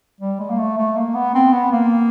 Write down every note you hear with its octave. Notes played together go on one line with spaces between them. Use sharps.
G3
G#3
A#3
A3
A3
A#3
B3
C4
B3
A#3